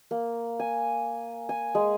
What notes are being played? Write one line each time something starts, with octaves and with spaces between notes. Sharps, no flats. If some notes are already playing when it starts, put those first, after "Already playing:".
A#3
G#5
G#5
G#3